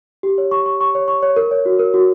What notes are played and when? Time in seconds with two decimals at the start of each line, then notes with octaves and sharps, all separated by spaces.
0.23 G4
0.38 C#5
0.51 C#6
0.66 C#6
0.81 C#6
0.95 C#5
1.08 C#6
1.22 C#5
1.36 A#4
1.51 C#5
1.66 F#4
1.79 A#4
1.94 F#4